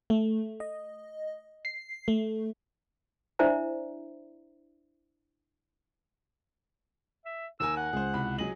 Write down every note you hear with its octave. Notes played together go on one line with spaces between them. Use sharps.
A3
D#5
C7
A3
D4 E4 C5 D5 E5 A#5
E5
D#2 A#4 G#5 E6
F#5
C#2 G#4 C5
C2 B5
F#3 G#4 D#5 F#7